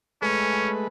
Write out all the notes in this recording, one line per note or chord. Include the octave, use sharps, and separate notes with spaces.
G#3 A3 C#4 B4